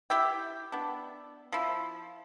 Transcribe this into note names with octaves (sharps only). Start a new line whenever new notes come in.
E4 G4 E5 G5
B3 D4
F3 E4